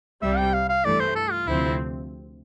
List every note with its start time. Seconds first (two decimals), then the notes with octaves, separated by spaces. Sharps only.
0.22 C2 C3 G3 E5
0.38 G5
0.53 F5
0.69 F5
0.84 G2 E3 A3 D5
1.00 C5
1.16 A4
1.32 F4
1.47 D2 C3 F3 C4 E4